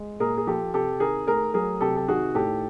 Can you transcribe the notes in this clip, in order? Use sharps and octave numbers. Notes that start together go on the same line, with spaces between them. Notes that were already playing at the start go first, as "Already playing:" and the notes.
Already playing: G#3
A#2 G#4 A#4
G#4
F3 G4 A4
C3 G4 A4
D#3 G#4 A#4
A3 G#4 A#4
F#3 G#4 A#4
C3 G4 A4
A4
D#3 F#4 G#4
A2 G4 A4